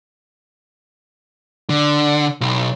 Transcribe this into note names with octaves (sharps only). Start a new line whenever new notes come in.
D3
B1